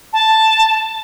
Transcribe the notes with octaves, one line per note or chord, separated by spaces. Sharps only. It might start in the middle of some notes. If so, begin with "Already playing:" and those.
A5